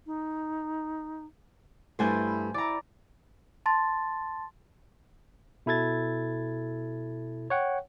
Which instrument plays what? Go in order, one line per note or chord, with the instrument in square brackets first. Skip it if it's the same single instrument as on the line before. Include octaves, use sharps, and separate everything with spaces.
[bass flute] D#4
[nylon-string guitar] G2 G3 A3 [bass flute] E4 [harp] C5 G#5 G6
[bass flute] E4 [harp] D5 A#5
[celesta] A5 C6 A6
[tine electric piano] B2 E4 A4 G#6 A6
C#5 F#5 G5